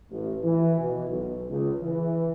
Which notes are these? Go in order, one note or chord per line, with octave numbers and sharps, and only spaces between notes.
A1
E3
B2
B1
C#2
E3